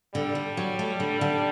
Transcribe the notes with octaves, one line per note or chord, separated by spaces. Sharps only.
D3 G3
D3
F#3
A3
D3
D3